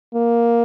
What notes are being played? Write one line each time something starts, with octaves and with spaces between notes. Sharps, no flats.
A#3